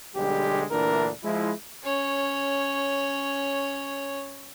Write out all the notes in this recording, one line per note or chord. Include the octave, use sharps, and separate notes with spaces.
B1 D3 G3 G#3 G4
D2 A#2 E3 D4 A#4
F3 G#3 E4
C#4 C#5